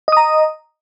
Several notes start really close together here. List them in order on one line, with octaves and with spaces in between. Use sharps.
D#5 D#6 A#5